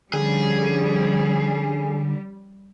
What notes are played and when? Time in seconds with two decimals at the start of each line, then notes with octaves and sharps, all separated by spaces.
0.14 D3 F3 G3 C#4 G#4